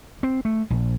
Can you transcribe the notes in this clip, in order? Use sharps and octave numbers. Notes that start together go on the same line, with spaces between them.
C4
A3
A#1